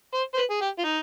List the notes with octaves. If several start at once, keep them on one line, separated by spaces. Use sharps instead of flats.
C5
C5
B4
G#4
G4
F4
D#4